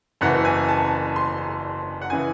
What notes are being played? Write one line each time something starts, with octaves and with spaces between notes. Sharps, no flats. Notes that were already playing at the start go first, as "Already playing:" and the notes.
F#1 F#2 E3 F#5
G#5
A5
C6
F#5
C#3 E3 G#5